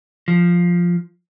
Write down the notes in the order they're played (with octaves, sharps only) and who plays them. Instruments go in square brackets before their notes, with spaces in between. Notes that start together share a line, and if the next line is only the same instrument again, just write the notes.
[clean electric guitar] F3